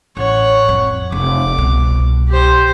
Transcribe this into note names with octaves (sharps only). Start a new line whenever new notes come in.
A1 C#5 F#5
F2
F1 D6
C2 B2
G4 C5